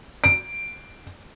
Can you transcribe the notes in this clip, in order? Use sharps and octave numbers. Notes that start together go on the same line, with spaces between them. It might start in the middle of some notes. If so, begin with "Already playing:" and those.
D7